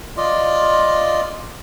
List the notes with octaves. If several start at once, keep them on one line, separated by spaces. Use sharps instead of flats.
F4 D5 D#5